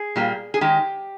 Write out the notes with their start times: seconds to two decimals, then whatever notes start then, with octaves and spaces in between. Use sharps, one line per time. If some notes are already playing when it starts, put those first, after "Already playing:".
Already playing: G#4
0.16 A#2 G3 A#3
0.54 G#4
0.61 D#3 G#3 G4